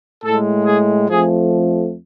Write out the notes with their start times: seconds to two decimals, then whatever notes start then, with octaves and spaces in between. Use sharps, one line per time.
0.23 A2 G#3 A4
0.66 G#4
1.09 F2 F3 A3 G#4